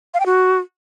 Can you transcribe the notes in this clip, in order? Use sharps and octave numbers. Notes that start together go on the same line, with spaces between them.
F5
G5
F#4